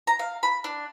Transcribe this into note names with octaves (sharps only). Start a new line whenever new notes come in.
A#5
F5
B5
D4